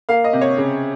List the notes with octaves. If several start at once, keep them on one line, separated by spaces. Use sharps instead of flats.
A#3 F5
D#5
C3
C#5
C#3